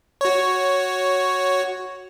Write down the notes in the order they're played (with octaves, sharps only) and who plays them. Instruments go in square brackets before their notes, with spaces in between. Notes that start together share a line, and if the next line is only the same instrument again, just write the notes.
[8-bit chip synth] F#4 C#5